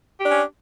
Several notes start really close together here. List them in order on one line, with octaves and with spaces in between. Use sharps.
G4 D4 C#4